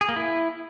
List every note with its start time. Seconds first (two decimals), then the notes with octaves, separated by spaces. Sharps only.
0.01 G#4
0.09 A#3
0.16 E4